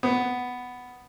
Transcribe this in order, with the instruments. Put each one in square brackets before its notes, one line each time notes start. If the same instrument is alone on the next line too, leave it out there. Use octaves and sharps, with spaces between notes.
[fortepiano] B3